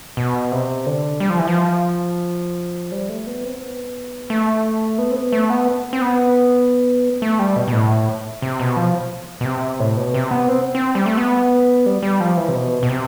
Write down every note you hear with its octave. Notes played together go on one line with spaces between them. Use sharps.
B2
C3
D3
G3
F3
E3
F3
G3
A3
B3
C4
B3
A3
B3
C4
B3
A3
B3
C4
B3
A3
G3
B2
B2
A2
C3
B2
F3
B2
C3
A2
B2
C3
B3
C4
C4
G3
A3
B3
G3
G3
F3
E3
C3
B2
B2
C3